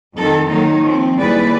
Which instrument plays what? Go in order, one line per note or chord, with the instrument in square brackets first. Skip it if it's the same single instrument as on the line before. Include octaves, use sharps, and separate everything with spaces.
[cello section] F2 D#3 F3 A4
D#3 F#3 A#3 D#4 C#5
F3 C4
D#2 G3 E4 G#4 B4 D5